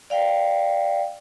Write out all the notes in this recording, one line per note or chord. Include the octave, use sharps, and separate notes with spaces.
D5 F5 G5